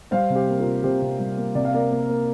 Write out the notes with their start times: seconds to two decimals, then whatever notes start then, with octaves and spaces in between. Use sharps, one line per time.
0.11 G3 C5 F5
0.30 C3
0.35 G4 C5
0.48 A#3
0.60 F4 A#4
0.66 C3
0.83 C3 G4 C5
1.02 C3
1.19 G3
1.37 A#3
1.55 C3 D5
1.65 F5
1.74 A#3 A#4 D5
1.92 A#3
2.09 A#3